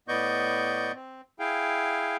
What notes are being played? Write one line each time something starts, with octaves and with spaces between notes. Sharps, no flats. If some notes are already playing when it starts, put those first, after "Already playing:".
A2 B3 D5 D#5 C#6 G6
C4
E4 G#4 F5 G5